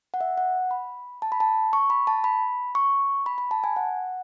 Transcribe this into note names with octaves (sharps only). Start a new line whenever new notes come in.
F#5
E5
F#5
B5
A5
B5
A5
C#6
B5
A5
B5
C#6
B5
B5
A5
G#5
F#5